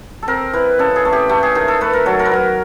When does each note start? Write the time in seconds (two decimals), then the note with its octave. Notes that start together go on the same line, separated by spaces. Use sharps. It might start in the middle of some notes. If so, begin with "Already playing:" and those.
0.23 A4
0.28 C4 A#4
0.53 E3 B4
0.79 C#3 A4
0.96 G#4
1.05 A3
1.13 G4
1.29 A3 G4
1.43 G#4
1.55 D#3 G#4
1.68 A4
1.81 A3 B4
1.93 A#4
2.06 F#3 A4
2.19 A#4
2.26 B4
2.31 F#3 A#4